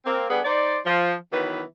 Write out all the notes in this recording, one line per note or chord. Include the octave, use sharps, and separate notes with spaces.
A#3 C4
G3 B3 D4 G#4
D#4 C5 D5
F3
D#3 E3 F#3 B3 B4